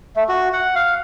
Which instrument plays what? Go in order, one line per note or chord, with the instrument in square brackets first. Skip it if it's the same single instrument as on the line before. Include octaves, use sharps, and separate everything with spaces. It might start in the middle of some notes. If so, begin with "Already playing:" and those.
[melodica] A3
F#4
F#5
F5